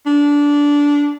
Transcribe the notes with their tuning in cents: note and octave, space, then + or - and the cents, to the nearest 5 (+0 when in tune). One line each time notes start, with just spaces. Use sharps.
D4 -20